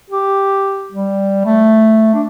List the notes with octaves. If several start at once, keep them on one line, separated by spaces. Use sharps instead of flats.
G4
G3
A3
D4